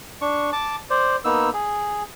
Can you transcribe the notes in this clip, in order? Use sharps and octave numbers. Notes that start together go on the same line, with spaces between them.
D4 C#6
A5 D6
C5 D5
A#3 B3 D#4 E6
G#4